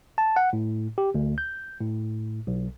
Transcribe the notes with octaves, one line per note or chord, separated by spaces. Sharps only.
A5
F#5
A2
G4
D2
G6
A2
B1